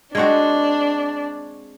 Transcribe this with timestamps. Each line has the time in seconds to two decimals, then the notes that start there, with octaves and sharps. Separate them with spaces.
0.15 G#3 C4 D4 F#4 C#6 G#6